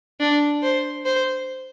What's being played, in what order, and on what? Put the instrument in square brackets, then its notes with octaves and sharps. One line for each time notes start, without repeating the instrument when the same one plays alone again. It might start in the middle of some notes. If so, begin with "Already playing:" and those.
[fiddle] D4
C5
C5